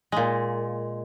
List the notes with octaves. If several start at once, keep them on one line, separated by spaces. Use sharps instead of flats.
A#2 G#3